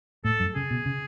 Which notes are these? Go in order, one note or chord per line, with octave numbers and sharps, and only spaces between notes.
A2 A4
F#2
C#3 G#4
B2
C#3